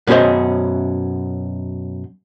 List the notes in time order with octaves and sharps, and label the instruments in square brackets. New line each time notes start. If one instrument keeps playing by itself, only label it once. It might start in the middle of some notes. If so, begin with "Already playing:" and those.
[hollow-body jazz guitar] F#2 B2 C#4 G#4 C5 D#5